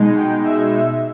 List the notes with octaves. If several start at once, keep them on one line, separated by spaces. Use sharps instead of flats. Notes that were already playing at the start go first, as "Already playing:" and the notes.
Already playing: B2 G#3 D#4
G5
E5